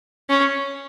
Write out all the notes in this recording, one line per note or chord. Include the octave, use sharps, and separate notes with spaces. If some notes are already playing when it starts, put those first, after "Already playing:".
C#4